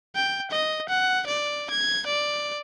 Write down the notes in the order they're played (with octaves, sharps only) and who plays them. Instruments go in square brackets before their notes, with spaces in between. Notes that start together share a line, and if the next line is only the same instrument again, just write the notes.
[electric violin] G5
D#5
F#5
D5
G#6
D5